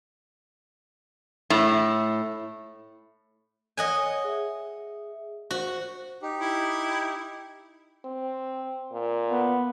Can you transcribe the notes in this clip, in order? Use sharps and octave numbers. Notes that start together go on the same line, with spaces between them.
A2
C#5 D#5 F#5 G#5
G#4 E5
F#4 C5
D#4 G4
E4
C4
A#2
B3